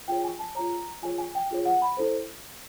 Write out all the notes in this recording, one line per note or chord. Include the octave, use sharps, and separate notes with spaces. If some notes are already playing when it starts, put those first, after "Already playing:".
F4 G#4 C#5 G5
G#5
A5
F4 G#4 C#5 A#5
F4 G#4 C#5 G#5
G#5
G5
F4 G#4 C#5
F#5
B5
E4 A4 C5